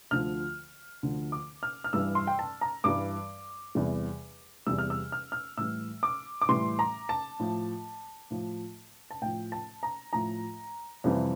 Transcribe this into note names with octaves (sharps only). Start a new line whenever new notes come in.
D2 D3 F3 F6
D2 D3 F3
D6
F6
F6
G2 E3 G3 E6
C6
G5
A5
A#5
G2 E3 G3 D6
E2 C3 E3 G3
E2 C3 E3 G3 E6
F6
E6
F6
F6
A2 E3 G3 E6
D6
D6
A2 E3 G3 C6
A#5
A5
A2 F3
A2 F3
A5
A2 F3 G5
A5
A#5
A2 F3 A#5
F2 C3 E3 G3